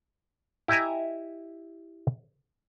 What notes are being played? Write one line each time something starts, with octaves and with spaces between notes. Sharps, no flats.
E4 G4 D#5 E5 G#5 A#5